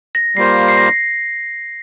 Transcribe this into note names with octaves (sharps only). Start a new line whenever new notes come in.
A#6
G3 A#3 F4 C5 C7
C7
A#6